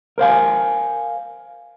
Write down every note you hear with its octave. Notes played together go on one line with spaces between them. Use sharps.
A#4 C5 F5 G#5